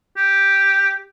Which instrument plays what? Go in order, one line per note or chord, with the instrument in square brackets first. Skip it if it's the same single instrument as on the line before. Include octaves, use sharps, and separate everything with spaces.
[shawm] G4